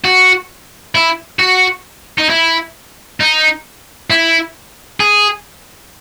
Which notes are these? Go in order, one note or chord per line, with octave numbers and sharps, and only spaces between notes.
F#4
E4
F#4
D#4
E4
D#4
E4
G#4